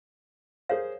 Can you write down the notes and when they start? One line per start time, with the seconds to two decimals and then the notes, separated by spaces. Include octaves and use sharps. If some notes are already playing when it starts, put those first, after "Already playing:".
0.69 G#4 A#4 C5 C#5 F5